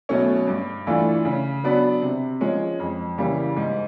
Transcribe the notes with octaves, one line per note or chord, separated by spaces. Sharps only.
B2 F#3 A3 C#4
G2
E3 A3 D4 F4
C#3
F#3 B3 D4
C3
F3 G#3 C#4
F2
C#3 E3 G3 A#3
G#2